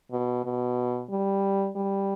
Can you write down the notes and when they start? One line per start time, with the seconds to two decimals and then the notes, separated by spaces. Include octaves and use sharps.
0.11 B2
0.45 B2
1.10 G3
1.76 G3